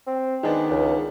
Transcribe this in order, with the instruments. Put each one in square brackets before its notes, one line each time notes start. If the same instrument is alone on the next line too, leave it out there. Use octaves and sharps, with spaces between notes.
[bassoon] C4
[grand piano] D#3 B3 D4 [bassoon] G#3
[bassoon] C#2